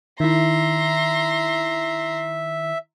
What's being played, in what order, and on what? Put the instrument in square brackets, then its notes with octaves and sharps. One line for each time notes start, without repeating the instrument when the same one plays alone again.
[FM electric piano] D#3 E4 [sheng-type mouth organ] E5 [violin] A#5 C6